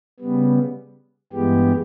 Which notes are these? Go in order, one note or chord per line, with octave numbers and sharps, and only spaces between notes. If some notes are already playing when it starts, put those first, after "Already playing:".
C#3 G3 B3
G2 E3 G#3 B3 G4